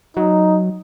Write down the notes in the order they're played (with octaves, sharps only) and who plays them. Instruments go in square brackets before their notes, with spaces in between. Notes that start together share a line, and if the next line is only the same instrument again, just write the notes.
[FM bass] F#3 [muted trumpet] D#4